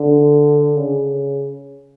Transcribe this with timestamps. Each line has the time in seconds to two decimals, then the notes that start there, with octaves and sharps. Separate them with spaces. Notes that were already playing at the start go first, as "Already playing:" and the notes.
Already playing: D3
0.76 C#3